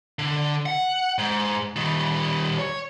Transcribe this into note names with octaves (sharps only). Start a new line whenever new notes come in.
D3
F#5
G#2
D#3 G3
C#5